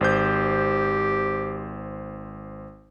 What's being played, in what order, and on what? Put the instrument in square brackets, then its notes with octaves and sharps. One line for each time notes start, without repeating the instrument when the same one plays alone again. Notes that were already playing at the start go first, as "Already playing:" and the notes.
[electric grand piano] G#1 C5 G6 [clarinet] G4